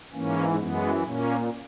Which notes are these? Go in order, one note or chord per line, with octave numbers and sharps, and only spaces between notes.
G#2 E3 A#3 C#4
F#2 E3 G#3 B3
A#2 A#3 C#4